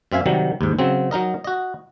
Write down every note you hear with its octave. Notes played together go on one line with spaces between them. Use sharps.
F#2 C4 E5 F5 G#5
C3 D#3 F#3 G3
D#2 G#2
C#3 F#3 C4
F#3 D#4 A#4 D#5
F#4 D#5